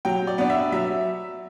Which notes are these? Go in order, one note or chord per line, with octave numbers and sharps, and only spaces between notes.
F#3 G5
D5
B3 D4
E5
F#3 E5